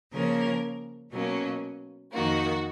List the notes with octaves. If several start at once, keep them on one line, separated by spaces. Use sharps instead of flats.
C#3 F3 A#3 C#4 A#4
B2 F#3 A#3 C#4
F2 D#3 A#3 F#4